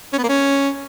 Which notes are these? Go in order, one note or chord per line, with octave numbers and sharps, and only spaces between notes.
C#4
B3
A#3
C#4